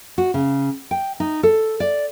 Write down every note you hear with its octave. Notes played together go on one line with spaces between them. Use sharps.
F#4
C#3
G5
D#4
A4
D5